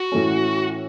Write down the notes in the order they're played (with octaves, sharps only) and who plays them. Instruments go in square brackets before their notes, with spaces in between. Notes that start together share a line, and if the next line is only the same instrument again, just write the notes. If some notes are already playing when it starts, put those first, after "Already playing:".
Already playing: [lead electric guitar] F#4
[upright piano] A2 E3 A3 C#4